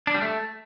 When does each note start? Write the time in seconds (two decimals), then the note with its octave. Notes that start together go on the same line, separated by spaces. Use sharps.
0.07 D4
0.14 G3
0.22 A3